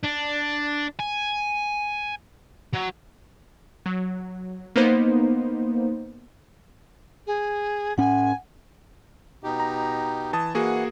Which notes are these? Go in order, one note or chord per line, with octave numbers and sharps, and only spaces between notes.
D4
G#5
F#3
F#3
A#3 B3 D#4 C5
G#4
A2 C#4 F#5 G#5
B2 D#4 G4
A#5
E3 A5 D#6
E3 A#3 F#4 G#4 F#5